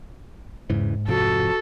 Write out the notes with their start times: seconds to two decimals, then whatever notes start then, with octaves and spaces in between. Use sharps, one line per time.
0.70 E2 G#2 C#3 E3
1.08 F1 C3 F3 F#4 A4